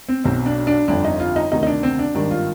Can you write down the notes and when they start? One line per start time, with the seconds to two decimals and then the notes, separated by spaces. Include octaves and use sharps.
0.09 C4
0.24 B1 B2 C4
0.46 D4
0.67 D4
0.88 G1 F2 D3 F3 D4
1.05 D#4
1.20 F4
1.36 D#4
1.51 D2 C3 D#3 D#4
1.63 D#4
1.67 D4
1.83 C4
1.99 D4
2.14 G#1 G2 D#3 D4
2.31 F4